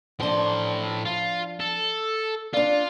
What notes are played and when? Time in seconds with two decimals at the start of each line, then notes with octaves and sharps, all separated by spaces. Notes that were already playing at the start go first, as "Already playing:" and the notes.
0.20 A2 F3 D4 C6
1.05 F4
1.60 A4
2.53 D4 F4 D5